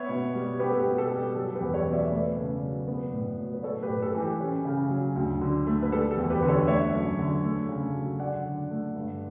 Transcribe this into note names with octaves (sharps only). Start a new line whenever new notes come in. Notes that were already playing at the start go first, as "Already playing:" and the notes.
Already playing: B3 C#5 E5
B2
G3
B3 G4 B4
A4
G4
B2
A4
G3
G4
F#3 A4
G4 B4
E2
A4 C#5
B2 D5
C#5 E5
A3 B4 D5
C#3
F#3
B3
A2
F#3
B4
A3 A4 C#5
G4 B4
A2
A4
E3
G4
C#4
C#3
F#3
D2
D3
A3
B4
G3 A4
A4
E2
G4 B4
D3
A4 C#5
A3 C#5 E5
F#2
D3
A3
C#3
F#3
D4 D5 F#5
D3
A3
G2